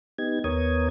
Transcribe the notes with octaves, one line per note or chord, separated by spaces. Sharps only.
B3 D#4 G4 G#6
D#2 B3 A#4 C#5 D#6 G#6